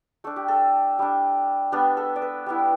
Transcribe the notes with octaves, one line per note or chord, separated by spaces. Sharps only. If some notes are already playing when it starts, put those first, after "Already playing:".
A3 D4 A4
G4
A4
G3 D4
G3 B3 D4
A4
D5
B4
G3 B3 E4